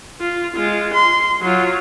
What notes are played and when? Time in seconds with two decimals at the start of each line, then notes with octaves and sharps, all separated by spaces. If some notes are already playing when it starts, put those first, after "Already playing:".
0.21 F4
0.55 G#3 F4
0.93 C6
1.42 F#3 F4